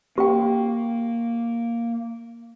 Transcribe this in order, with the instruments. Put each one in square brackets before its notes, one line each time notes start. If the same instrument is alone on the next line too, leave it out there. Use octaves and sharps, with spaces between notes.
[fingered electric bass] A#3 [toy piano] G4 G5